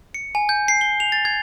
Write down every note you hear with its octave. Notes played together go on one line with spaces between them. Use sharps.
C#7
G#5
G6
C7
G7
F7
A6
G#6